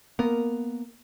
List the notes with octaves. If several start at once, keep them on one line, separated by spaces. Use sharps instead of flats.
A#3 B3 A#4